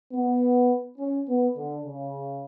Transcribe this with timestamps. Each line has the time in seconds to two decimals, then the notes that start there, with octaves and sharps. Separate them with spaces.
0.13 B3
0.99 C#4
1.28 B3
1.57 D3
1.86 C#3